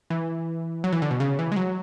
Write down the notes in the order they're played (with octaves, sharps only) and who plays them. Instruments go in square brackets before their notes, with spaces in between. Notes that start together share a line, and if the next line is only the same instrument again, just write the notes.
[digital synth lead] E3
F#3
E3
D3
B2
C#3
E3
G#3
F#3